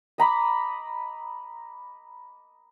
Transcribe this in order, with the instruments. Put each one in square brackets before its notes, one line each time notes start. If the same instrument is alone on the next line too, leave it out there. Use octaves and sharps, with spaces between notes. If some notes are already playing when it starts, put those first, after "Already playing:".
[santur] D#5 A#5 B5 D6